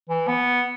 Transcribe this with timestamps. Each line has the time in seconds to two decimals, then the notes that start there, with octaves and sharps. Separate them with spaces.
0.09 E3
0.28 B3